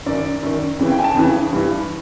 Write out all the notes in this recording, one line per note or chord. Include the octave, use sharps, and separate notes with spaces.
F#2 D#3 D5
F#2 D#3
F2 C#3 E3
G5
G#5
A5
F2 C#3 E3
G2 E3